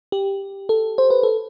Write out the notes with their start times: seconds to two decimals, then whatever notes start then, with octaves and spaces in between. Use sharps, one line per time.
0.12 G4
0.69 A4
0.98 C5
1.10 B4
1.23 A4